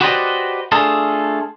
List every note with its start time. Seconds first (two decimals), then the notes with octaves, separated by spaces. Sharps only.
0.01 F#4 G4 B4 C5 D5 D#5
0.72 A3 D4 F4 G#4 A4